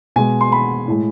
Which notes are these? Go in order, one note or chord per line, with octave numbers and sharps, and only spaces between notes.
B2 G#3 G#5
C6
B5
A2 G#3